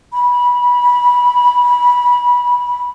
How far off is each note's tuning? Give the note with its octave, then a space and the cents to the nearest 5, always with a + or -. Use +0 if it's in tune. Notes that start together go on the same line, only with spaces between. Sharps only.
B5 -20